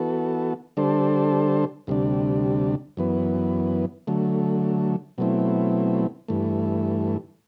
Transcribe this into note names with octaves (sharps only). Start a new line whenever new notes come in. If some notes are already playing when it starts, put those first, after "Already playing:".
Already playing: E3 B3 F#4 A4
D3 G3 D4 A4 C5
D2 C3 G3 D4
F#2 E3 B3
D3 F#3 A3
B2 F#3 A3 C4 E4
G2 E3 A3